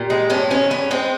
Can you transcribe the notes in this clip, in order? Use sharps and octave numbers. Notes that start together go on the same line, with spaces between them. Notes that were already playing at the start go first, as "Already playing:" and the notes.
Already playing: A#2 G4
G#3
G2 C#4
D#3 C#4
G2 C#4
G#3 C4